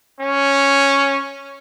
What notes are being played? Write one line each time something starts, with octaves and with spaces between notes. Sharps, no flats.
C#4